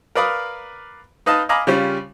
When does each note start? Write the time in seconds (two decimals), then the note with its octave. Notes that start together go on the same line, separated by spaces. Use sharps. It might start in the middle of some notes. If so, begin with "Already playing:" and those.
0.15 A#4 B4 D5 F5 B5 D#6
1.26 D#4 B4 D#5 F5 A5
1.49 D#5 F5 G#5 A#5 B5 D6
1.67 C#3 G3 C#4 F4